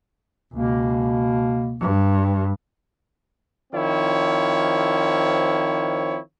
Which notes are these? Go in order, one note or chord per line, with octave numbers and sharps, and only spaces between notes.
C#2 B2 A#3
G2
D#3 F3 C4 E4 C#5